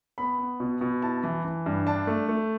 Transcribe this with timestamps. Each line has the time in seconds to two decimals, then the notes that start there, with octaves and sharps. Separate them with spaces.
0.18 B3 B5
0.38 B3
0.60 B2
0.81 B2
1.02 E4 A5
1.24 E3
1.45 E3
1.66 G2
1.87 D4 A5
2.07 A3
2.29 A3